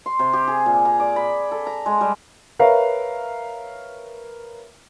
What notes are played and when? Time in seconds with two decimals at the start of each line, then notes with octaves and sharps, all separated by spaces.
0.06 C6
0.19 C3
0.33 G4
0.48 G#4
0.66 A#2
0.85 A#5
1.00 D5
1.16 B5
1.52 A4
1.67 A#5
1.86 G#3
2.01 G3
2.59 A#4 B4 C#5 E5 F5 A#5